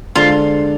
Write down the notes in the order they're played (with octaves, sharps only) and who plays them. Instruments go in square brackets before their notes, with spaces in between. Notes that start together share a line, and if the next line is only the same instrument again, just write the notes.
[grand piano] D3 G#3 D4 A4 C5 [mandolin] F4